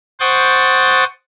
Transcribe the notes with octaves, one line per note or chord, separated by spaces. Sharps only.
C5 F#5 G5 C#6 D#6 A6